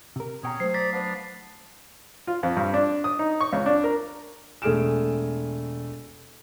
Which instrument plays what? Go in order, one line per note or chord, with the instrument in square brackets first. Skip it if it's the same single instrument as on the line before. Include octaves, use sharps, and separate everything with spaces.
[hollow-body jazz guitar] C3 A#4
[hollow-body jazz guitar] B2 G5 A#5 [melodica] C#4 G#4 C#5
[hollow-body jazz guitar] F#3 A3 [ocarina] C5 [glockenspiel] C7
[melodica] D5 A#5 [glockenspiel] A6 B6
[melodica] B3 D4 F5
[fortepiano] F4
F2
G2
D4
D#6
D#4
C#6
C#2
D4
A#4
[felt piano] E1 A3 G#4 F6 D7 E7